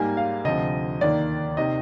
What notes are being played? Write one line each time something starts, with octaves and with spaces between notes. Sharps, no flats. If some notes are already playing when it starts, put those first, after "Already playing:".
Already playing: G#2 G3 A#3 G#5
F5
D2 C3 F3 D#5
D#2 D#3 A#3 D5
C3 D#3 D#5